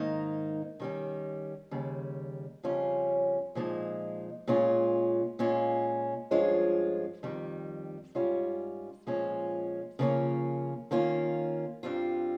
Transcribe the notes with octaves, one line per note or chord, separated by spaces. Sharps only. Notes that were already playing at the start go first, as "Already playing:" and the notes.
Already playing: G#2 D#3 A#3 D#4
D#3 G3 C#4
D#2 C#3 G3
F2 C#3 G3 C#4 F4
A#2 F3 G#3 D#4
A#2 G#3 C#4 F4
A#2 G#3 C#4 F4
G2 F3 G#3 C#4 F4
F2 D#3 G3
G#2 G3 C#4 F4
A#2 F3 G#3 C#4 F4
C#3 F3 A#3 C#4 F4
D#3 A#3 C#4 F4
G2 G3 C4 F4